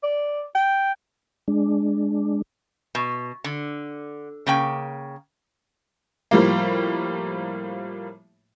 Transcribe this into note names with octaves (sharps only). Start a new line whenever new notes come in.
D5
G5
G#3 D4
B2
D3
C#3 A#3 G5
A2 F3 G3 A#3